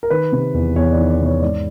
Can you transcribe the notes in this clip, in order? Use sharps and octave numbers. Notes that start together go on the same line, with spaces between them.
A#4
D#3 B4
C3
E2
E2 C#5
D5
D#3
D5
C3
C#5
G#2 D5